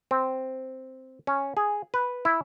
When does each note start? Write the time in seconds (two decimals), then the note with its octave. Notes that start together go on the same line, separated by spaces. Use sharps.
0.11 C4
1.27 C#4
1.57 G#4
1.94 B4
2.25 E4